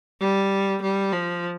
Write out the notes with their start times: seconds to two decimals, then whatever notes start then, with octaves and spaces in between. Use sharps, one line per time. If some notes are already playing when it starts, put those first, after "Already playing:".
0.21 G3
0.82 G3
1.13 F3